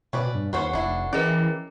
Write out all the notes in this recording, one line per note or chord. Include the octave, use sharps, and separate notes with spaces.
B2 C#4 B4 D5
G2
D#2 B3 C#4 C5 F#5 C#6
F1 D4 E4
E3 C#4 G#4 A#4 D5 D#5